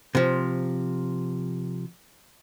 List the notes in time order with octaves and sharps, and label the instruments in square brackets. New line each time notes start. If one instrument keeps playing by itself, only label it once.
[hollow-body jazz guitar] C3 F3